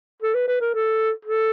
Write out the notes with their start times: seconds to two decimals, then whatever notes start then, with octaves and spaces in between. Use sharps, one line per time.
0.22 A4
0.34 B4
0.48 B4
0.61 A#4
0.74 A4
1.25 A4